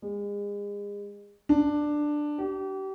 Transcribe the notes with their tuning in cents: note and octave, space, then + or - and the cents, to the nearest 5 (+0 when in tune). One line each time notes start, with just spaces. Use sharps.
G#3 -35
D4 +10
G4 -35